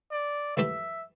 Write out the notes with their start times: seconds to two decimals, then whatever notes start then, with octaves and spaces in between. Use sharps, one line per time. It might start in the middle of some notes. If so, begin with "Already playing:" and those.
0.12 D5
0.57 F#2 E3 A3 E4 G4 E5